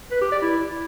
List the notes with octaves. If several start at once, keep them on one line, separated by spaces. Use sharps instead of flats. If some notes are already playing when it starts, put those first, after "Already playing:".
B4
G4
D5
E4